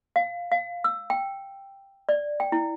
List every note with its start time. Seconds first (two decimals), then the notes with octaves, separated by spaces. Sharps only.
0.16 F5
0.52 F5
0.84 E6
1.10 G5
2.09 D5
2.40 G5
2.52 E4